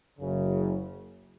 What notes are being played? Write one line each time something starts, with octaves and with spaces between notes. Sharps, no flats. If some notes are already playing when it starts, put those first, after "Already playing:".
F#1 F#2 C#3